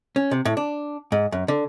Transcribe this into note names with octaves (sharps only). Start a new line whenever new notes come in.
C#4
C3
A2
D4
G#2
F#2
D3